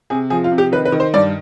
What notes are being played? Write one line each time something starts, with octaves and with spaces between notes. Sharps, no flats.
C3 G#4
F3 G#4
F4
C3
G4
D#3 B4
B4
D#3
C5
G2 D5